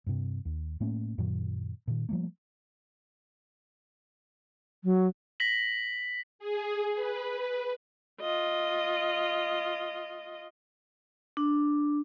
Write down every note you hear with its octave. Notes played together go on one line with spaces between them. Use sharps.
G2 C3
D#2
A2 A3 A#3 C#4
F#2 A#2 D#3 F#3
A#2 D#3
F3 G3 A3 A#3
F#3
A#6 B6 F#7
G#4
B4
F4 D#5
D4